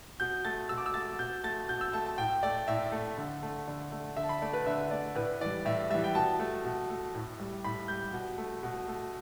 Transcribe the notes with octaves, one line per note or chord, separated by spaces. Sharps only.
B2 G6
A3 A6
B2 E6
D6
E6
A3 A6
B2 G6
A3 A6
B2 G6
E6
A3 A5
A5
A2 G5
A3 D5
A2 E5
A3
D3
A3
D3
A3
D3 E5
A5
B5
A3 D5
B4
D3 E5
A3 D5
A2 B4
E3 G3 D5
A2 E5
E3 G3 E5
G5
B2 A5
A3
B2
A3
A2
G3
A2 B5
G3 G6
B2
A3
B2
A3